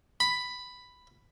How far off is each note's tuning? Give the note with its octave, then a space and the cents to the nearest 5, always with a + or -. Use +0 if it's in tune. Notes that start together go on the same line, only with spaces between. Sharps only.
B5 +5